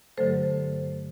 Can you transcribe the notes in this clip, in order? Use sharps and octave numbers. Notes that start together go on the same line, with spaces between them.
G2 D3 F#3 A3 A4 C5